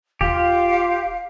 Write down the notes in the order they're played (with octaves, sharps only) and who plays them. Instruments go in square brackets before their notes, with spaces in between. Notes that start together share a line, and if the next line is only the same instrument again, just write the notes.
[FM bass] D#1 [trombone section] F4 [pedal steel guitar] G4 [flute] F5